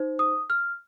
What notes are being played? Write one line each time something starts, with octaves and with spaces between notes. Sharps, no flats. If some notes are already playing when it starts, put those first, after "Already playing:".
Already playing: D#4 C5
D#6
F6